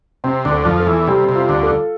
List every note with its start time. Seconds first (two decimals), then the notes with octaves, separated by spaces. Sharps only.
0.24 C3 C4
0.45 D2 D3
0.51 A4
0.65 F2 F3
0.79 A4
0.87 E2 E3
1.07 C3 G3
1.29 C3
1.35 F4
1.49 D2 D3
1.63 A4